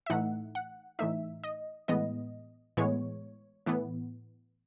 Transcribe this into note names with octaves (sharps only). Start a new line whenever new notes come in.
E5
A2 E3 A3 D#4 F#5
F#5
A2 E3 A3 D#4 E5
D#5
A2 E3 G#3 B3 D#5
A2 E3 G#3 B3 C#5
A2 E3 B3